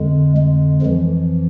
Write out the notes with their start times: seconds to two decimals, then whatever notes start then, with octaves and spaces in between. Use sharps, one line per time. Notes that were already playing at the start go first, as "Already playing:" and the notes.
Already playing: F2 D3 G#3
0.37 G#3
0.82 F2 E3 F3